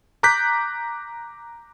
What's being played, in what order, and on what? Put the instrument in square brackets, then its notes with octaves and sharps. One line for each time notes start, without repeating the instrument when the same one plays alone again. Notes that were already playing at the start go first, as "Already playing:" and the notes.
[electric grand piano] A#5 D6 F#6 G6 B6